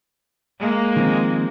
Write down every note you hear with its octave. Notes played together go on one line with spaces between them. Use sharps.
G#3 A#3
D#3 F3 C4